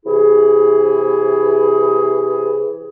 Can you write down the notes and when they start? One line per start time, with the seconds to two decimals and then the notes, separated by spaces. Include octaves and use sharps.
0.05 C3 E3 E4 G#4